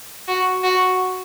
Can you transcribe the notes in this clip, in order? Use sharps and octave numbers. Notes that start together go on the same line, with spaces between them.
F#4
F#4